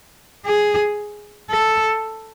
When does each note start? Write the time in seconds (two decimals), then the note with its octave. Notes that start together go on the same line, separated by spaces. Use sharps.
0.46 G#4
1.50 A4